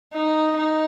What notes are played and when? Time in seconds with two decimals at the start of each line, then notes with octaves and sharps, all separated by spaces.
0.13 D#4
0.57 D#4